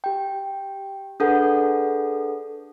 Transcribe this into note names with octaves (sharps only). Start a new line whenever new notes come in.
G4 G5
D4 G#4 A4 B4 F#5